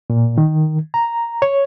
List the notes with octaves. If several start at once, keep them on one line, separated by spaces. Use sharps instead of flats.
A#2
D#3
A#5
C#5